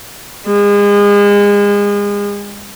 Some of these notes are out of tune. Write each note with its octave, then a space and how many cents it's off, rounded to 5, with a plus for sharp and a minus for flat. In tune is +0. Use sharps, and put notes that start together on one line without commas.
G#3 -35